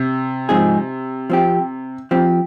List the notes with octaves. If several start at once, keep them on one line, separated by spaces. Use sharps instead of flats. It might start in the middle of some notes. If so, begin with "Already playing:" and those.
Already playing: C3
G#2 F3 C4 D#4 G#4
F3 C4 G4
F3 C4 G4